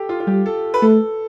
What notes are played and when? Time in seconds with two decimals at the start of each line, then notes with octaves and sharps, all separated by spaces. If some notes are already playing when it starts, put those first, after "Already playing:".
Already playing: G4 A4
0.09 F4
0.20 F4
0.27 G3 G4
0.46 A4
0.74 B4
0.82 A3 A4